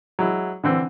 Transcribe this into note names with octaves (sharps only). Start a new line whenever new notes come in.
F#3 G#3 E4
D3 E3 C4